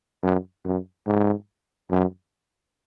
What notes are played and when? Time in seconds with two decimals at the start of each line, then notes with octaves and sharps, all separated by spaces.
0.23 F#2
0.65 F#2
1.06 G#2
1.90 F#2